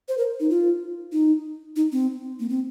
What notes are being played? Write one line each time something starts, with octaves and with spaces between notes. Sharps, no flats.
C5
A#4
D#4
F4
D#4
D#4
C4
A#3
C4